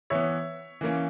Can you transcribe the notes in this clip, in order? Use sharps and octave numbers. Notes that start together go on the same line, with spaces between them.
E3 B3 C#5 E5
E3 A#3 C#4